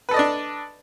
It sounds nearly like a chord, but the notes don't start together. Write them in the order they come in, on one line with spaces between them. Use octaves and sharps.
B4 A4 D#5 D5 D4